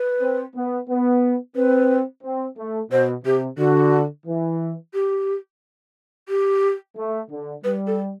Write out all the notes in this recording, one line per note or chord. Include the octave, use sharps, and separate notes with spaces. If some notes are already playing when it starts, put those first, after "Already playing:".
Already playing: B4
C4
B3
B3
C4 B4
C4
A3
B2 C5
C3 G4
D3 F#4
E3
G4
G4
A3
D3
G3 B4
A4